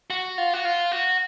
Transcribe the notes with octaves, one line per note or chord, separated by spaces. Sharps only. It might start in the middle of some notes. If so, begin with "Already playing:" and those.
F#4
F4
F#4
F4
F#4